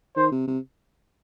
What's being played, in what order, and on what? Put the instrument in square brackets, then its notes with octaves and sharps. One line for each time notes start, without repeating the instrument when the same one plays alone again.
[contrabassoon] D#3 [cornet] C5
[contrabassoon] C3
C3